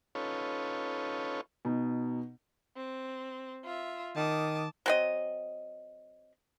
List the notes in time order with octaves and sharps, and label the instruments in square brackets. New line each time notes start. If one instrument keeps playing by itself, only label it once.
[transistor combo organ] C#4 D#4 F4 A4 B4 C#5
[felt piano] B2 D#4
[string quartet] C4
F4 E5
[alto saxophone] D#3 [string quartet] A5 D6 D#6
[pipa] F#3 C4 D#5